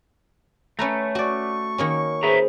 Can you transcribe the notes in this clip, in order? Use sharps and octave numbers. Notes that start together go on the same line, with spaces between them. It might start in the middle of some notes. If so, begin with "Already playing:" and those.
A3 C#4 B4 A#5
F#4 D5 C#6
D#3 A#3 C#4
G#4 B4 C5 E5 A#5